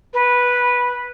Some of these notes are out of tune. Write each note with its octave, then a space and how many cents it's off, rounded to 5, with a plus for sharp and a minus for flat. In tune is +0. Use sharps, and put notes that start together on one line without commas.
B4 -10